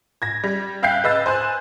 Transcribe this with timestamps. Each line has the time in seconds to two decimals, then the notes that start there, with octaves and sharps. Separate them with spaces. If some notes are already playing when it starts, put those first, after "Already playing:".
0.22 G#6 A#6
0.44 G3
0.83 E5 F5 G5 F#6 G6 C7
1.04 B4 D#5 E6 A6
1.26 C5 G#5 F#6